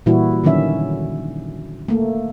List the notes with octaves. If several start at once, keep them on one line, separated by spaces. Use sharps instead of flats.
A#2 E3 G3 E4 F#4
D3 D#3 F#3 C#4 E5
A3 A#3